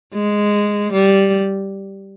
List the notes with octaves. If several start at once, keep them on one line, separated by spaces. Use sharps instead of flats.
G#3
G3